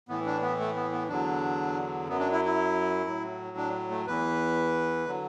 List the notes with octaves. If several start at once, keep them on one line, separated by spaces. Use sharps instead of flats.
A2 E3 B3
D4
B3
A3
B3
B3
E2 D3 F#3 D4
F#2 F#3 B3
D4
E4
E4
A2 F#3
D4
A3
E2 E3 B4
D3 F#3